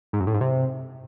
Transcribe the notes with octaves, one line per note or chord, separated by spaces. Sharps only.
G#2
F#2
A2
G#2
C3